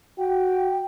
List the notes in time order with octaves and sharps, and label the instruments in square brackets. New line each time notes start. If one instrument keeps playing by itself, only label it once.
[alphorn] F#4 [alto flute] G5